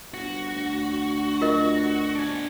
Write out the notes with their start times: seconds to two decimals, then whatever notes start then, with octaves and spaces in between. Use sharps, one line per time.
0.14 G1 F#4
0.55 D2
1.41 F4 A#4 D#5
2.15 D4 G#5